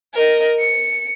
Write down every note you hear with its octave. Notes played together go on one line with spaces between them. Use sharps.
A#4 D#5
C#7